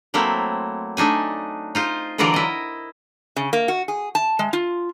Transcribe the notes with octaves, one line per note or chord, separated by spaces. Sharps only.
F#3 A3 A#3 C4 E4
A3 D4 D#4 G#5
D#4 F4 C5
D3 E3 F#3 F4 A#4 D5
E4 D#5
C#3
A#3
F#4
G#4
A5
G#3
F4